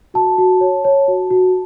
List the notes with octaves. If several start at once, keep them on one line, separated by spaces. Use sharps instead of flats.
F#4 A5
F#4
C#5
C#5
F#4
F#4